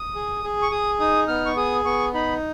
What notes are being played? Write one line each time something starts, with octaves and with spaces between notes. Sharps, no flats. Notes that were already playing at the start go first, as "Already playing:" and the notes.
Already playing: D#6
G#4
G#4
C#6
G#4 D#6
D#4 D#6
B3 F6
C#6
G#4 D#6
B3 C#6
D#4 B5